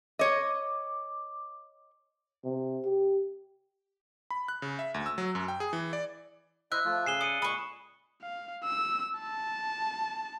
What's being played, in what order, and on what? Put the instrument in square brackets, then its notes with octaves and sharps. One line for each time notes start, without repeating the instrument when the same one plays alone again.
[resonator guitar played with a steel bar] C#5 D#5 [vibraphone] D6
[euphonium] C3
G4
[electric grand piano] B5
F#6
C#3
E5
D2
E6
F#3
F#2
G5
G#4
E3
D5
[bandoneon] E4 C5 D#5 [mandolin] E5 [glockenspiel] F#6
[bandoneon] F3 A3 F4
[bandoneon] C#3 G#4 G#5 [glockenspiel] C7 E7 G7
[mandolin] D5 [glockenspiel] D#6 C#7 D#7
[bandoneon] A#2 G#3 G#5 [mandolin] B5 C#6 [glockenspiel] D#6
[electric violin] F5
E6
A5